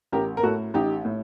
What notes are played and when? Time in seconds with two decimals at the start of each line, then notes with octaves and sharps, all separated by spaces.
0.12 A1 G4 A#4
0.37 A#4
0.43 A2 F#4 A4
0.74 A1 D#4 G4
1.05 A2